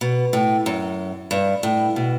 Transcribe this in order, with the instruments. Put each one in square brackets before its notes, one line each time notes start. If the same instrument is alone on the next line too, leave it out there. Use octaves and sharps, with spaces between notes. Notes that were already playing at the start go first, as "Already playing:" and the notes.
[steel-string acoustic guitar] B2
A2
F#2
G2
A2
B2